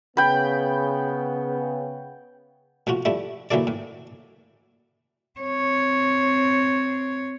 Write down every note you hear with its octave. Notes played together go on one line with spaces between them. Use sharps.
C#3 B3 G5 B5
A2 F3 F4 F#4
F3 G3 A3 E4
E3 F#3 A#3 E4 A4 D5
A2
C4 C#5